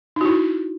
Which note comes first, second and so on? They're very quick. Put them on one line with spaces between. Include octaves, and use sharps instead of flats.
D#4 F#4 E4